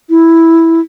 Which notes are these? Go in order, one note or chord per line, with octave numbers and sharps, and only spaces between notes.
E4